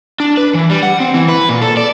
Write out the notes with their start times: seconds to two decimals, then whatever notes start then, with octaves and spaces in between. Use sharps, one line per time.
0.20 D4
0.37 B4
0.54 E3
0.70 G3
0.83 F#5
1.00 C4
1.14 E3
1.28 B4
1.49 A#2
1.62 A4
1.77 D5